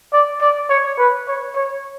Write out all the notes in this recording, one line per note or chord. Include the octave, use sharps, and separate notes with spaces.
D5
D5
C#5
B4
C#5
C#5